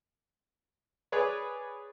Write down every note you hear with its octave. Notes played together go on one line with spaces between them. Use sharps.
G#4 B4 C#5 D5